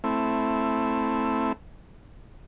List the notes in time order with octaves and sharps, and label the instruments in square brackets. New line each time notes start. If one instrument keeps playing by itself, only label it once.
[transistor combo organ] A3 C4 E4